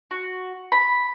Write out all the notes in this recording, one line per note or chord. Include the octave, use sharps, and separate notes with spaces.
F#4
B5